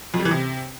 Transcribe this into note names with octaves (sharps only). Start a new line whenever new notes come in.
F2
G3
E3
C3